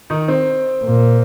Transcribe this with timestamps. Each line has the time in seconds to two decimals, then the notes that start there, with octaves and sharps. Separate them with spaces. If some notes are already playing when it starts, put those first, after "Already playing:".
0.10 D#3 D#4
0.28 C4
0.85 A#2